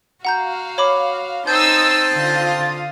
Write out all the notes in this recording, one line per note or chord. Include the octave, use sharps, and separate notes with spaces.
F#4 F5 F#5 A#5 G6
C#5 B5 D6
C4 D#4 A5 C6 D#6 E6 G6
D3 F4 F5 D#6